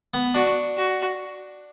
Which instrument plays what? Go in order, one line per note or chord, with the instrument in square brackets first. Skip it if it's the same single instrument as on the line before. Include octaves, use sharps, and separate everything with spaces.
[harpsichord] B3
[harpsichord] D4 [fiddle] F#4
[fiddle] F#4